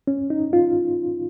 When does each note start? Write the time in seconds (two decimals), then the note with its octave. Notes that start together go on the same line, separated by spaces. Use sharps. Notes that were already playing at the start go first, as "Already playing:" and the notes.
0.07 C#4
0.30 D#4
0.53 F4